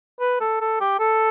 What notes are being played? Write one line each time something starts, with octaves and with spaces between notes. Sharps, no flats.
B4
A4
A4
G4
A4